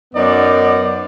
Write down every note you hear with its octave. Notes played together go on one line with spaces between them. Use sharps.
F#2 B3 D#4 D5